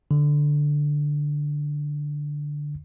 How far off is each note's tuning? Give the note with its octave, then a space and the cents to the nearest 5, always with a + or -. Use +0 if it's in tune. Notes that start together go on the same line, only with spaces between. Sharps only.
D3 +0